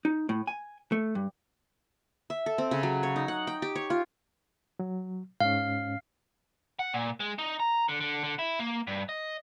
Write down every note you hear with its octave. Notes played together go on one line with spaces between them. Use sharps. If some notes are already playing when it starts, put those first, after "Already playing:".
D#4
A2
G#5
A3
G2
E5
A4
C4
C#3
F#3
C#5
D#4
F#5
G5
G4
C#5
F4
F#3
G#2 C#4 F5
F#5
A#2
G#3
D#4
A#5
D3
D3
D3
E4
A#3
G2
D#5